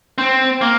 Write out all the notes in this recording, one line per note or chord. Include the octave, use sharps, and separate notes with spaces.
C4
A#3